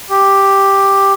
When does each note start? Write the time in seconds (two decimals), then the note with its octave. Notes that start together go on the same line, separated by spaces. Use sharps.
0.10 G4